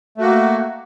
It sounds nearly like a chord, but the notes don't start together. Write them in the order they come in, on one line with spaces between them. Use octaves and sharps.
A3 F#4 A#3